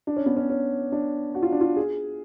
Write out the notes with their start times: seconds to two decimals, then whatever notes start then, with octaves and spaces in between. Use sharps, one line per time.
0.07 D4
0.16 C#4
0.26 B3
0.37 C#4
0.50 C#4
0.92 D4
1.35 F#4
1.43 F4
1.52 D4
1.61 F4
1.76 G#4